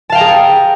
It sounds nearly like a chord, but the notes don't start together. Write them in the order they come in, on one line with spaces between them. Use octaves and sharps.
A5 F5 G5 A#5 G#4